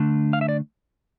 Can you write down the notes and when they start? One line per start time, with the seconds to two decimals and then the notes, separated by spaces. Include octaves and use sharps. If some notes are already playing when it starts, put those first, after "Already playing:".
Already playing: D3 A3 D4
0.33 F5
0.41 E5
0.49 D5